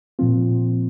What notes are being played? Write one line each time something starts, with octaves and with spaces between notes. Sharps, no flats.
A#2 F3 C4 F4